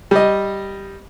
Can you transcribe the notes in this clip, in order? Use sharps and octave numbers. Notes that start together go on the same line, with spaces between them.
G3 D#5